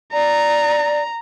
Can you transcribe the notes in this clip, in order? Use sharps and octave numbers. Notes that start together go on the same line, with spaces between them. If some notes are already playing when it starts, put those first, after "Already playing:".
D5 A#5